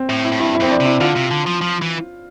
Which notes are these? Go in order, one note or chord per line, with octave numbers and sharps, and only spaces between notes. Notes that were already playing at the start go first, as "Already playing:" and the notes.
Already playing: C4
A2
E4
A2
G2 E4
E4
F2 C4
D4
C3
E4
D3 F4
C3
D3
F3
F3
E3